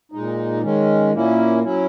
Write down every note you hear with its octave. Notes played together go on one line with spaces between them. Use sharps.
A#2 G#3 D#4
D#3 G#3 C#4
A#2 A#3 C#4 E4
F#3 C#4 E4